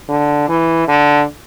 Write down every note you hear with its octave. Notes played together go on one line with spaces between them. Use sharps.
D3
E3
D3